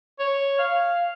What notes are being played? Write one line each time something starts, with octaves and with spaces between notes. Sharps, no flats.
C#5
F5